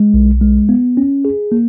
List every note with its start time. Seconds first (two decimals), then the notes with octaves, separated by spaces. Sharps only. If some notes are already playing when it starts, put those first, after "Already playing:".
Already playing: G#3
0.14 B1
0.41 G#3
0.69 B3
0.97 C#4
1.25 G#4
1.52 A#3